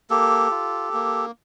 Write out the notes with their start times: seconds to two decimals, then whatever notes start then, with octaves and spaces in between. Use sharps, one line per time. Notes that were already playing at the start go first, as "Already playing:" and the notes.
0.10 A#3 G4 A4
0.51 F4
0.94 A#3